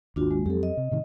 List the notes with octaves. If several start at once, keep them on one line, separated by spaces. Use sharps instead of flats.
G#1 D#2 D4 F4 F#4
G#3
F2 F#3 C4 G4 A4
D#5
C3
A2 C3 D#3